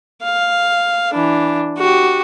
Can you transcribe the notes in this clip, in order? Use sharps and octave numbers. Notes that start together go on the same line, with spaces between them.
F5
E3 D4
F#4 G4